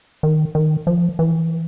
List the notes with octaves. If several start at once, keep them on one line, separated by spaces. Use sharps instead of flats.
D#3
D#3
F3
E3